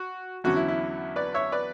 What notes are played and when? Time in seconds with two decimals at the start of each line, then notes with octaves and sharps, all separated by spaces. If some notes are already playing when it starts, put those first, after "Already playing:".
Already playing: F#4
0.44 E2 D3 F#3 C#4 F#4
0.56 E4
0.68 E4
1.16 B4 D5
1.34 C#5 E5
1.52 B4 D5